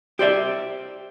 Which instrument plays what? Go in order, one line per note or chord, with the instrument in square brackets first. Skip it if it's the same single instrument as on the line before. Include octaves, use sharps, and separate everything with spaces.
[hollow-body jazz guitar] G4 C5 D5 E5